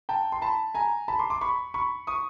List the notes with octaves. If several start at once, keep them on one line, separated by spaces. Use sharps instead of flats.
G5 A5
C6
A5 B5
G#5 A#5
A5 B5
C6 D6
C6 D6
B5 C#6
B5 C#6
C#6 D#6